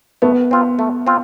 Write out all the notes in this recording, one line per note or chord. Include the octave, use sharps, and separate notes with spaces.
A3 B3
C4 F4
A3
C4 F4